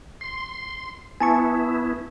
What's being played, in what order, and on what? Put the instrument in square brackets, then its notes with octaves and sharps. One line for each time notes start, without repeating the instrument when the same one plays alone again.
[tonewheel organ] C6
[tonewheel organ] B3 E4 [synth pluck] G#5 A5 C#6